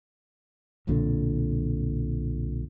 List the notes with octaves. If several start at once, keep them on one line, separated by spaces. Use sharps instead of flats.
B1 F2 A#2 D3